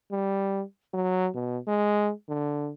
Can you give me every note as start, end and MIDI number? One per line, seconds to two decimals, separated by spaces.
0.11 0.63 55
0.94 1.29 54
1.34 1.58 47
1.67 2.12 56
2.29 2.71 50